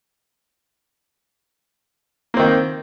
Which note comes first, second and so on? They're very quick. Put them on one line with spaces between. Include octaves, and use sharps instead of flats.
A#3 C4 D#3